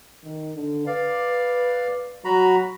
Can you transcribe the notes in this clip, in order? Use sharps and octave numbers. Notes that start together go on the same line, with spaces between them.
D#3
D3
B4 D5 F5
F#3 F#4 A#5 B5